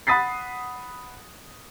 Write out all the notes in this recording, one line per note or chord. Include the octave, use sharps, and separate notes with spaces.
F#5 B5 D#6 A6 B6 C7